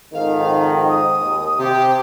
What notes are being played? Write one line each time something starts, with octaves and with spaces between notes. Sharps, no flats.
F2 G#2 D#3 F5
D#6
D#2
C3 G4